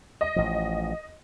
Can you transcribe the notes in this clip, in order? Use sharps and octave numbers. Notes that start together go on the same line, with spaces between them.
D#5
A1 F3